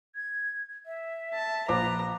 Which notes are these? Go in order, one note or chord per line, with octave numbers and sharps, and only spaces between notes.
G#6
E5
A5
A#1 B4 C5 A#5 D6